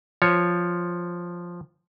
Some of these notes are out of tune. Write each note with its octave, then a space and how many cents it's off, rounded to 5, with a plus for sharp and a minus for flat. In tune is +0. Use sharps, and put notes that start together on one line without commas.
F3 +0 C#5 +0